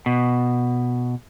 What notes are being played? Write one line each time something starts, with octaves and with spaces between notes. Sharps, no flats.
B2